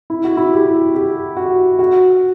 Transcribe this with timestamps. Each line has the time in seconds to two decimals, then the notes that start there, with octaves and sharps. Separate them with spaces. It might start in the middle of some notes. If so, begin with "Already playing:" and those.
0.10 E4
0.24 F#4
0.37 E4
0.53 G4
0.95 G4
1.37 F#4
1.79 F#4